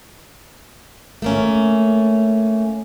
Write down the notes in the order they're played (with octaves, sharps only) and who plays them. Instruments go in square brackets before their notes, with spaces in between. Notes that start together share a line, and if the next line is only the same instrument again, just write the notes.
[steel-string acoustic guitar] A3 A#3 C#4